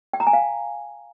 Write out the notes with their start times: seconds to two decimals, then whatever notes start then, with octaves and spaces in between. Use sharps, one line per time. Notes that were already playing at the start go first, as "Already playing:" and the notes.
0.13 G5
0.20 A#5
0.27 G#5
0.33 F5